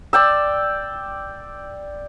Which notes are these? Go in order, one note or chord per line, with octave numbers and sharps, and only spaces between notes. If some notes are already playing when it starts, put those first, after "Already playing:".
D5 G5 E6